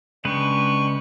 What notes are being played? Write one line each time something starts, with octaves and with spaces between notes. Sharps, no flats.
C#3 G#3 D4 B4 G5 C#6